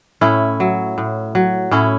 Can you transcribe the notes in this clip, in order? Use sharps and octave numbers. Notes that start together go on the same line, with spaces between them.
A2 C#4 E4
F#3
A2
F#3
A2 C#4 E4